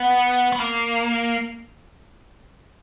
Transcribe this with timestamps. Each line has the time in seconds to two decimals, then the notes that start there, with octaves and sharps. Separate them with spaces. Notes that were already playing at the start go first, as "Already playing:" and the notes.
Already playing: B3
0.53 B3
0.60 A#3